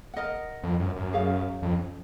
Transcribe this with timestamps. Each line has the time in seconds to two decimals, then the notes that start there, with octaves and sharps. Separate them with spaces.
0.14 A#4 D#5 F#5
0.63 F2
0.80 F#2
0.96 F#2
1.13 C#4 G#4 C#5 F5
1.62 F2